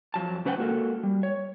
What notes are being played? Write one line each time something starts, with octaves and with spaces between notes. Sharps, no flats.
F2 F#3 A5
C#3 C#4 B4 C5 F#5 G5
G#3 A#3 F#4 A4 A#4
G3
C#5